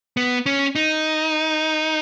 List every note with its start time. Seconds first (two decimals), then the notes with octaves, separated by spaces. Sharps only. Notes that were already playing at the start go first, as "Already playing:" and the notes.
0.17 B3
0.46 C#4
0.75 D#4